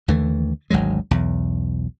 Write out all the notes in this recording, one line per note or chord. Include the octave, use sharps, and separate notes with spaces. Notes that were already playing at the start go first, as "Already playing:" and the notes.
D#2 D3 E3 A3
G#1 D2 F#3 G#3
B1 E2